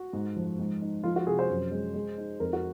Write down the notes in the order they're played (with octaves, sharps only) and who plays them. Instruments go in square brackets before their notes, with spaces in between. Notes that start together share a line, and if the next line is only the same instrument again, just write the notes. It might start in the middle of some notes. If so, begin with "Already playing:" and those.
Already playing: [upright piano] F#4
G#2
F3
G#2
D#4
F3 F4
F#4
C3 G#4
C5
F#2
G#3
G#3
D#4
F2 A#4
F#4